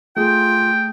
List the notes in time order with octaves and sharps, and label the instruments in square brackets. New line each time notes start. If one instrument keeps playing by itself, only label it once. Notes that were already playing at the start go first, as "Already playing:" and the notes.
[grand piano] A3 G#4 [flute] F4 [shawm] G5